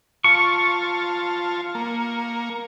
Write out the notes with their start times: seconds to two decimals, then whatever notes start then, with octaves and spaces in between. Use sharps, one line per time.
0.24 F4 A5 C#6
1.75 A#3